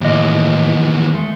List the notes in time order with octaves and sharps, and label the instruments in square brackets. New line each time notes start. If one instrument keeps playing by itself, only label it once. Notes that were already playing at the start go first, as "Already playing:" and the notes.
[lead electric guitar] D#2 E3 [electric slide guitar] A2 D#5
[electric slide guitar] G#3 A3